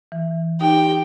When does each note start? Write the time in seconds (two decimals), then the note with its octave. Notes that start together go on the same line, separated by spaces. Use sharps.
0.12 E3
0.61 D#4 G4 G5